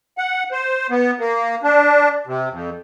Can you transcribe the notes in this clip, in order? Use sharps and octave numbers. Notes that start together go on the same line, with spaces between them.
F#5
C5
B3
A#3
D4
C3
F2